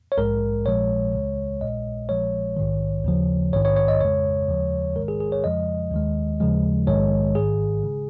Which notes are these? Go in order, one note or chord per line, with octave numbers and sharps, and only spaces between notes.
C#5
A#1 G#2 G#3 A#4
A#1 A#2 F3 G#3 C#5
C#2 C#3 G#3
A#1 A#2 G#3 D#5
A#1 A#2 F3 G#3 C#5
A#1 G#2 D#3
D#2 C#3 F3
A#1 G#2 D#3 C#5
C#5
C#5
D#5
F2 C#3 G#3 C#5
D#2 C#3 F3 G#3
A#1 G#2 D#3 G#3 A#4
G#4
G#4
C#5
F2 C#3 F3 G#3 D#5
D#2 D#3 G#3
D#2 C#3 F3 G#3
A#1 G#2 D#3 G#3 C#5
G#1 G#2 D#3 G#4
C#3 G#3